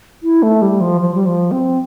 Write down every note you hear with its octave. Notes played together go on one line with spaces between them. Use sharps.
E4
A3
G3
F3
F3
G3
F3
C4